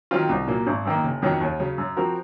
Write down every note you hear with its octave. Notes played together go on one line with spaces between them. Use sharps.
D#3 F#3 C4 F4
C2
A#2 F#3 A#3
G#1
F#2 D#3 A#3
F#1
F2 D#3 F#3 C#4
D#2
C#3 F#3 C#4
F#2
F3 C4 F#4 A#4